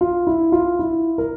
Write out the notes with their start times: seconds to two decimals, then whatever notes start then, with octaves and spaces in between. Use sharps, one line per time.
0.01 F4
0.27 E4
0.52 F4
0.79 E4
1.18 A#4